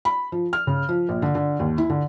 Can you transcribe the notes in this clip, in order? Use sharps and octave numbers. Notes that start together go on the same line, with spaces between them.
B5
F3
F6
C#3
F3
A#1
D3
D3
D#2
E4
D3